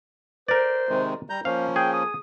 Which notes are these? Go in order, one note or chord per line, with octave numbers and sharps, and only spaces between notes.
A#4 C5 D5
C3 D#3 G#3
G3 A#5 G6
F3 A#3 C#4 C5 F5
G#4 G5
D#6